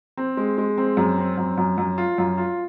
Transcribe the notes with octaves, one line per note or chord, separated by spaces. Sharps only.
C4
G#3
G#3
C4
F#2
C4
F#2
F#2
F#2
F4
F#2
F4